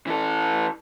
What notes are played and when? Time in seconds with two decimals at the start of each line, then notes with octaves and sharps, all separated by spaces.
0.07 E3 A4